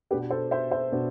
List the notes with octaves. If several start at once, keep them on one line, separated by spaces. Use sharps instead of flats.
B2 B3 D4 G4 B4
A4 C5
C5 E5
C5 E5
B2 B3 D4